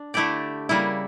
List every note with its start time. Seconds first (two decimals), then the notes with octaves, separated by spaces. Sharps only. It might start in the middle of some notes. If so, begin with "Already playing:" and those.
Already playing: D4
0.14 D3 A3 E4 G4 D5
0.69 C#3 G3 A#3 E4